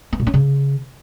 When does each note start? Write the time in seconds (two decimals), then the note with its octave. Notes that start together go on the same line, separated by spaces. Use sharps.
0.13 B3
0.20 A#2
0.27 C#4
0.34 C#3